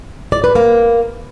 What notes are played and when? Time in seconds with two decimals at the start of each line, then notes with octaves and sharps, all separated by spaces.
0.32 D5
0.44 B4
0.55 A#3